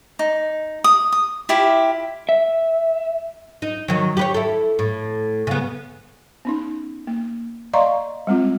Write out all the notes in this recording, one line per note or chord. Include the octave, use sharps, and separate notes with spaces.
D#4
D#6
D#6
E4 F4 G4 E5
E5
D#4
D#3 F#3
G4 B4 C#5
E4 A4
A2
C#3 B3
B3 C#4 D#4
A#3
D5 D#5 F5 A#5 C6 C#6
G3 G#3 C4 F4